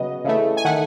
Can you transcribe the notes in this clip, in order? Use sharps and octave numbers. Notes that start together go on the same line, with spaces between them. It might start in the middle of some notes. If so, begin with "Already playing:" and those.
Already playing: C#3 F#3 B3 D#5
C#3 E3 A3
G#5
D#3 A3 F#5